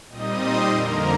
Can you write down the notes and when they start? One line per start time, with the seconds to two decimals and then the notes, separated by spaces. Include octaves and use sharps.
0.09 A#2 G3 C4 D#4 D#5 D#6
0.38 C5 C6
0.68 F2 D3 F3 A#3 A#4 A#5